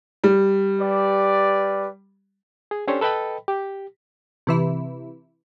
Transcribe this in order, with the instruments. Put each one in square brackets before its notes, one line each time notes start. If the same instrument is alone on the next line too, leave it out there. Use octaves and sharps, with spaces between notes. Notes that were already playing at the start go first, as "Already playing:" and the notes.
[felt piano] G3
[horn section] G4 B4 D5
[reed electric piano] G#4
C#4 D4 G4 A4 C5 C#5
A4 B4 D#5 G5 B5
G4
[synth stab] C3 E3 E4